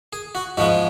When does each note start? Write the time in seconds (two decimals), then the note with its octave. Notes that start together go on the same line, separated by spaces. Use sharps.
0.13 G#4
0.35 F#4
0.57 G#2 F3 G#3 B3 F#4